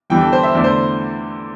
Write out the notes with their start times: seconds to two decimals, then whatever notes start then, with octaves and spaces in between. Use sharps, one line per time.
0.10 E2 E3 G3 D4 G5
0.21 A4
0.32 C5
0.43 E5
0.55 E2 D3 A3 E4 D5
0.64 C5